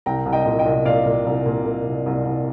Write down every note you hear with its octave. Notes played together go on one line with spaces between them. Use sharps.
C2 G5 A#5
C2
D#5 G5
A#2
D#5 G5
C2
A#2 D5 F5
A#2
C2
A#2
A#2
C2
C2
C2